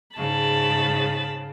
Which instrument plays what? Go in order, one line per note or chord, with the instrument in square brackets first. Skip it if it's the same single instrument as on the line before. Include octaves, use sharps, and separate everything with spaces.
[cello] G#2 C#3 [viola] A5 B5